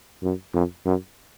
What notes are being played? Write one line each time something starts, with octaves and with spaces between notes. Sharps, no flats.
F#2
F2
F#2